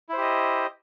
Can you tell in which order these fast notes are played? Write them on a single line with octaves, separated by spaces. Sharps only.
E4 C5 G4 D#5